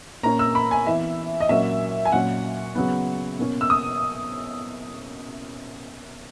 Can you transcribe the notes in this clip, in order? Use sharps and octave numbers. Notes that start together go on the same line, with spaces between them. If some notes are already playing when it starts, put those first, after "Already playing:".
A#2 A#3 C#4 A#5
E6
B5
G#5
E3 B3 E5
D#5
A#2 F#3 A#3 C#4 E5
G#5
A#2 F#3 C#4 F#5
C#3 F#3 B3
B2 A#3 C#4
E6
D#6